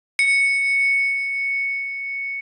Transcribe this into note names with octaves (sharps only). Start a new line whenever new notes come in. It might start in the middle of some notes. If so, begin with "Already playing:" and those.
C#7